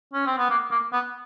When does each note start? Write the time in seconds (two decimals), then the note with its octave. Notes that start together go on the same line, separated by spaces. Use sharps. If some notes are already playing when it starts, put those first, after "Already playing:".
0.14 C#4
0.26 C4
0.38 B3
0.50 A#3
0.71 A#3
0.93 B3